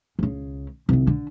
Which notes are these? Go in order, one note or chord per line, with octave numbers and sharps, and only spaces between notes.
C#2 C#3
C2 D#3
D3